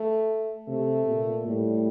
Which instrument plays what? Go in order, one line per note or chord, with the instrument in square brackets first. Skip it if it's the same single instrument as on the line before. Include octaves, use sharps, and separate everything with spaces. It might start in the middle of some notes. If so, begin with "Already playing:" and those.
Already playing: [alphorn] A3
[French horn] C3 [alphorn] A3
[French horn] A#2
[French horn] A2 [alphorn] G3